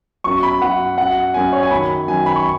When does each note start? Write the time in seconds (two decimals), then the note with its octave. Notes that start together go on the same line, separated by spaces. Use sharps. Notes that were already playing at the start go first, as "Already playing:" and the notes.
0.24 F#2 F#3 C#6
0.43 B5
0.61 F#2 F#3 F#5
0.98 F#2 F#3 F#5
1.34 F#2 F#3 G#5
1.53 C#5
1.63 G#5
1.71 F#2 D#3 F#3 B5
2.08 F#2 D#3 F#3 G#5
2.26 B5
2.36 C#6